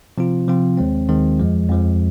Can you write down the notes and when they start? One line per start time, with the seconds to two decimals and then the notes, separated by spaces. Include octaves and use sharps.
0.18 C3 F3 C4 F4
0.48 C3 F3 C4 F4
0.78 D#2 D#3 G#3 C4
1.09 D#2 D#3 G#3 C4
1.39 F2 F3 G#3
1.69 F2 F3 G#3